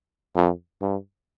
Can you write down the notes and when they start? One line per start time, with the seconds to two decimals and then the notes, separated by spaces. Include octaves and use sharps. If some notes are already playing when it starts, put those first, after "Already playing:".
0.35 F2
0.82 G2